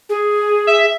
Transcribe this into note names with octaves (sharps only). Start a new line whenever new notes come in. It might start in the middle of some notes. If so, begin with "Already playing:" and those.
G#4
E5